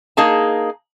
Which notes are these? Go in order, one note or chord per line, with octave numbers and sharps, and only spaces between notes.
A#3 D#4 G#4 A5